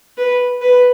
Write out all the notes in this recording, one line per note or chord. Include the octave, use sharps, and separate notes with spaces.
B4
B4